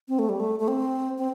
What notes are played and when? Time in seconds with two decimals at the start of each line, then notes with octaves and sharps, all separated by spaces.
0.08 C4
0.19 A3
0.29 G3
0.40 A3
0.60 A3
0.68 C4
1.18 C4